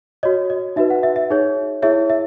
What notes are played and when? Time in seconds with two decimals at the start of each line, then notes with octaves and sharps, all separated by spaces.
0.23 F#4 C#5 D#5
0.50 D#5
0.76 D#4 F#4 B4 E5
0.90 F#5
1.03 E5
1.16 E5
1.30 D#4 G#4 C#5
1.82 E4 G#4 C#5 E5
2.10 E5